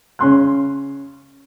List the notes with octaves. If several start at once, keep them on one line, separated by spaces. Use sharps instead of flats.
C#3 C#4 C6 F#6